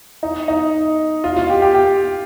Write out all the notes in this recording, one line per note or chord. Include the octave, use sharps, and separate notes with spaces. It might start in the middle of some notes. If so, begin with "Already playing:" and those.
D#4
D#4
F4
F4
G4
G4
G4